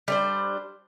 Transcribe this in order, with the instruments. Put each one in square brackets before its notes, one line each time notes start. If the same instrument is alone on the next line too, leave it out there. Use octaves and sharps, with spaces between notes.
[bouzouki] G3 D4 C5